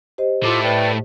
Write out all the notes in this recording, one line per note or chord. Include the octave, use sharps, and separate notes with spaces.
G4 C5 D#5
A2 A3 F4 A4 D6
B4 D5 G5